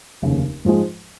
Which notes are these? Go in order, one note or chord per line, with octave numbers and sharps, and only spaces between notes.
F1 D#2 C#3
G#2 F3 G#3